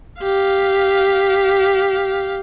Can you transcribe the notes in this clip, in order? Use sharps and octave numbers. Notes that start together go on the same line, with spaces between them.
G4 F5